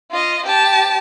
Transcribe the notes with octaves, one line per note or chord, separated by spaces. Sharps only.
F4 D#5
G4 A5